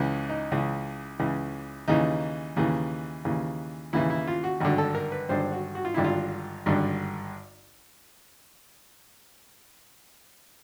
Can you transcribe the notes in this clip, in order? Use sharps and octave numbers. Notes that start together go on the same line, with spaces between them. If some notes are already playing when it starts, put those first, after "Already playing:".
Already playing: C#2 C#3 E3
D#4
C#2 C#3 E3
C#2 C#3 E3
D#2 C#3 E3 D#4
D#2 C#3 E3
D#2 C#3 E3
D#2 C#3 E3 E4
E4
F4
F#4
G#1 G2 D3 F#4
A4
A#4
B4
G#1 G2 D3 C5
F#4
F#4
F4
G#1 G2 D3 E4
F4
G#1 G2 D3